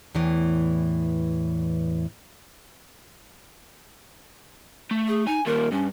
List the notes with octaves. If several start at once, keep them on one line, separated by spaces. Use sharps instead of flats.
E2 A2 E3
A3
G#4
D#4 G#5
D#2 A#2 A#4
G2 C#4